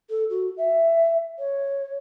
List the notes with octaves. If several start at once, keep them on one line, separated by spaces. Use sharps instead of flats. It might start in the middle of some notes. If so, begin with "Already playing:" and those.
A4
F#4
E5
C#5